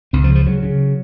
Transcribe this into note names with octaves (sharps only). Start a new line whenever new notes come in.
C#2 C4
F3
C#3
F3
C#3 F#3
C#3